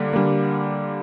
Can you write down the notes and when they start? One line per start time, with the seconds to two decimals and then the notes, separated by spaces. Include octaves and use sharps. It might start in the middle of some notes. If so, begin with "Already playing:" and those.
Already playing: D3 G3 A#3
0.13 D3 G3 A#3